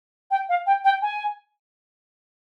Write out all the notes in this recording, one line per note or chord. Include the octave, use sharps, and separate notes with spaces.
G5
F5
G5
G5
G#5